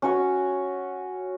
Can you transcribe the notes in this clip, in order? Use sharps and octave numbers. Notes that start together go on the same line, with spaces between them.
C#4 F#4 C#5